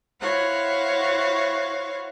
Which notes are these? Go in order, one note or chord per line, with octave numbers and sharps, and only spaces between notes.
E4 F#4 C5 C#5 F5 F#5